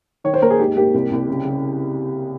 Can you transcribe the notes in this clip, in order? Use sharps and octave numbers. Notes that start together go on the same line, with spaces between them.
D#3 C#5
C5
D#2 A#4
G#4
G#2 G4
A#3 G4
C2
C2
C#3
C#3